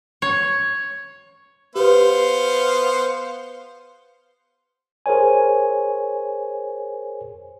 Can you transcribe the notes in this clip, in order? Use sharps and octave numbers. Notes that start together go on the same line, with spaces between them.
C#5
B3 G4 B4 C5 F5
G#4 A#4 C5 C#5 G#5